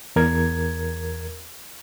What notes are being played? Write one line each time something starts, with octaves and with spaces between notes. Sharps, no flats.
E2 A#4 G#6